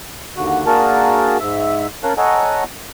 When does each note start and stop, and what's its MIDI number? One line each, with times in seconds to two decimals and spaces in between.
0.37 0.64 39
0.37 0.64 50
0.37 0.64 66
0.66 1.37 58
0.66 1.37 62
0.66 1.37 66
0.66 1.37 68
0.66 1.37 70
0.66 1.37 81
1.40 1.87 44
1.40 1.87 76
2.04 2.13 61
2.04 2.13 70
2.04 2.13 73
2.04 2.13 77
2.04 2.13 81
2.04 2.13 90
2.18 2.63 69
2.18 2.63 73
2.18 2.63 75
2.18 2.63 78
2.18 2.63 80
2.18 2.63 82